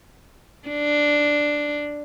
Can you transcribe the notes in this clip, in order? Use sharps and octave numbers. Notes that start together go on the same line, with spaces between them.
D4